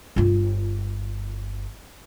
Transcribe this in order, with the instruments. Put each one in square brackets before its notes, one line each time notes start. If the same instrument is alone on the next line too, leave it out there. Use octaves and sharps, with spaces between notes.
[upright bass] G1 F4